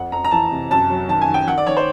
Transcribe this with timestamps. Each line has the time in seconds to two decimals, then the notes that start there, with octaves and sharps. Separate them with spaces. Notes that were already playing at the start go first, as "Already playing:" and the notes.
Already playing: F2 F#5
0.12 F2 A#5
0.25 A#5
0.31 E3 A5
0.51 C3
0.71 F#2 A5
0.90 F#3
1.08 D#3 A5
1.21 G#5
1.29 D#3
1.34 G5
1.47 D#3 F#5
1.58 D5
1.67 D#3 C#5
1.77 C5